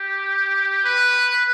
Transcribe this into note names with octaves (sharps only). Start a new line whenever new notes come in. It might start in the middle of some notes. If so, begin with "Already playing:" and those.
Already playing: G4
B4